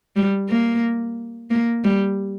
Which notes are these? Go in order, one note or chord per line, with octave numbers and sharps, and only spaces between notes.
G3
A#3
A#3
G3